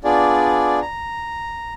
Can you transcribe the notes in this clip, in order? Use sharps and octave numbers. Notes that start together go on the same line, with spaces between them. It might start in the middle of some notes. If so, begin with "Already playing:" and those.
B3 D4 F4 G#4 D5
A#5